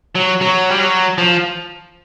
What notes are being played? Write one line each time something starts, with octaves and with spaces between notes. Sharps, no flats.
F#3
F#3
G3
F#3
F3